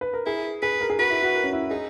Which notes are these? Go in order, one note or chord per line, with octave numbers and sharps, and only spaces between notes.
B4
A#4
E4 G#4
G#4 B4
A#4
G#4
F#4 B4
E4
F#4
A#4
C#4
E4
D#4 G#4